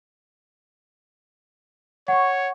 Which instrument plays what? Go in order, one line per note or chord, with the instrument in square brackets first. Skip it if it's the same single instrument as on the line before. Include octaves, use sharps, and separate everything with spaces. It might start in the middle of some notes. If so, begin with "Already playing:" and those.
[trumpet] C#5 [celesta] F#5 C#6